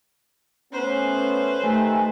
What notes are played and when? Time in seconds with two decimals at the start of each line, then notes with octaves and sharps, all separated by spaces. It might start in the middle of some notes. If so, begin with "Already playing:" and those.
0.73 A3 B3 C#4 B4 C5
1.61 D#3 A3 G4 G#5